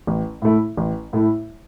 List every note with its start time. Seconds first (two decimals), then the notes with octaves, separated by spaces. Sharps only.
0.07 A1
0.42 A2 A3 E4
0.77 A1
1.13 A2 A3 E4